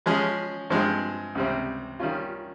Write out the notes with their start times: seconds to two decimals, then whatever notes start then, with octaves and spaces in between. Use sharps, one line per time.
0.06 F3 G#3 C#4 G#4
0.70 G2 F3 G#3 C4
1.35 C#2 C3 G3 C4
1.99 D#3 G3 C#4 F4